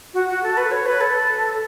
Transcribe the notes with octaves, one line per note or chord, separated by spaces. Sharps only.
F#4
F#4
A4
B4
C#5
B4
A4